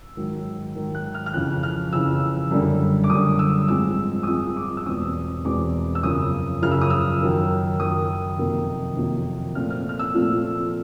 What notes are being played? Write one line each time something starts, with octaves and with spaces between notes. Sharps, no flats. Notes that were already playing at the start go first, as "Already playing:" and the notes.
Already playing: E6
G#2 D#3 F#3
G#2 D#3 F#3
F#6
F6
F6
F2 C#3 E3 F#6
F6
F2 C#3 E3 E6
F#2 D3 G3
D6
F#2 D3 G3 D#6
E6
G#2 F3 G#3 C4 E6
D#6
G#2 F3 G#3 C4 E6
D6
E6
E2 B2 G#3 C4 D#6
E2 B2 G#3 C4 D6
E6
F#2 C#3 F3 D#6
F#2 C#3 F3 F6
E6
D#6
E6
F#2 D#3 F#3
F#2 D#3 F#3 D#6
F2 C3 D#3 F#3 A#3
F2 C3 D#3 F#3 A#3
A#2 F3 A3 C4 F6
F6
F6
E6
A#2 F3 A3 C4